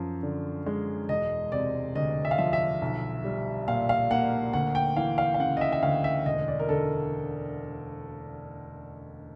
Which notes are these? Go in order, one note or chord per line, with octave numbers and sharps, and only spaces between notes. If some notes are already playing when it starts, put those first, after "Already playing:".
Already playing: F#2 F3
D3
G#3
E1 D#5
C3 D5
D2 D#5
E5
F5
F3 E5
E5
B1
G3
A#2 F5
F5
A#3 F#5
D2 F#5
G5
E3 F5
F5
F5
C#3 F#5
D#5
E5
E5
D2 F5
E5
E1 D#5
D5
A#4
D3 A4